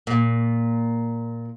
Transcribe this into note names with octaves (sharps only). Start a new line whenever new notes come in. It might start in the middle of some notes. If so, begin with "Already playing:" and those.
A#2